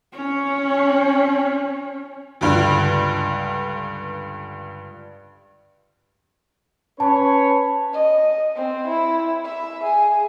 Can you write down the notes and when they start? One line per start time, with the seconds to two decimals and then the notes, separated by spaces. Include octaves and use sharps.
0.12 C#4 C#5
2.41 C#2 G2 D3
7.00 C#4 B4 C#5 A5
7.93 D#5
8.56 C4
8.87 E4
9.44 E5
9.84 G#4